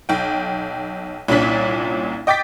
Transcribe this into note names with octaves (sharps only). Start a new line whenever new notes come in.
B1 G5
C2 A#2 C#4 D4 B6
D#5 G5 D6 A6 B6